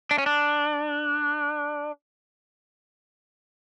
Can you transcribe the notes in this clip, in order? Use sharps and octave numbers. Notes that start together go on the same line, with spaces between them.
D4
C#4
D4